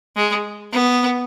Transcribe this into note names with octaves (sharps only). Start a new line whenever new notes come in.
G#3
B3